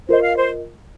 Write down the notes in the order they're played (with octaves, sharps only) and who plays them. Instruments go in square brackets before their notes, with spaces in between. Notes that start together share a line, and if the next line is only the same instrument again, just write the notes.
[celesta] F4 A#4 D#5 [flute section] C5
[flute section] F5
C5